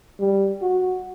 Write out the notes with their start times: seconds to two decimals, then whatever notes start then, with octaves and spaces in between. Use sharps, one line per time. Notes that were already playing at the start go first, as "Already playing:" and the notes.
0.20 G3
0.62 F#4